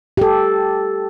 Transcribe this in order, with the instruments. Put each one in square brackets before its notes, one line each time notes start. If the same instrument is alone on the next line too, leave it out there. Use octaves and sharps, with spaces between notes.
[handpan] G4 A4